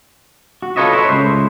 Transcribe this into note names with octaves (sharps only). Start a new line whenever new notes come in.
F#4
F4 A4 B4 C#5 D#5 E5
E4 C#5
C#2 A2 C5